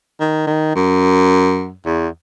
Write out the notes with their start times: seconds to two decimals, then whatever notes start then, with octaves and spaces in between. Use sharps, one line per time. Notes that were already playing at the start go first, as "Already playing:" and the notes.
0.20 D#3
0.47 D#3
0.75 F#2
1.86 E2